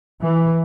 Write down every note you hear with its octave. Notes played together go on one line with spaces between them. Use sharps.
E3